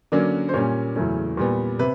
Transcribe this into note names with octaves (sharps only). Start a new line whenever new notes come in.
D3 F#3 A#3 C#4 D5
C5
A#2 G3 A#3 C#4 C#5
E2 C#3 F#3 A3 C#4
A#2 G3 B3
C3 B4